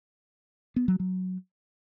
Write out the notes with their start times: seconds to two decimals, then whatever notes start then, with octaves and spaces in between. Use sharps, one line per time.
0.76 B3
0.88 F#3
1.00 F#3